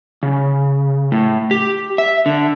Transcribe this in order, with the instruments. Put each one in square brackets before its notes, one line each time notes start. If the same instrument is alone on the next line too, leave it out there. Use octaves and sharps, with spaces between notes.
[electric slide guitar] C#3
A2
G4
E5
D3